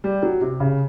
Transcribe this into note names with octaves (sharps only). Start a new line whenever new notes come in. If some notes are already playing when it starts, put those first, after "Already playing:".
G3
F#3
C3
C#3